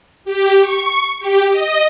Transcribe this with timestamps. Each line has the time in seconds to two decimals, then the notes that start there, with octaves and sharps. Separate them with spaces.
0.25 G4
0.60 C#6
1.19 G4
1.50 D#5